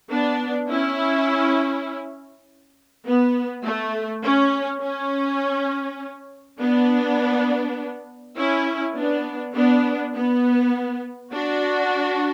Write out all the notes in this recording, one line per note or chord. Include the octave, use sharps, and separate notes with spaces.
B3 D4
C#4 E4
B3
A3
C#4
C#4
B3 D4
C#4 E4
B3 D4
B3 D4
B3
D4 F#4